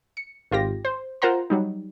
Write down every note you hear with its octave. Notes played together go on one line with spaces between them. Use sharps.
C#7
G#1 F4 G4 A#6
C5
F4 A#4 C5 F#5 A#5 C6
F#3 G3 D#4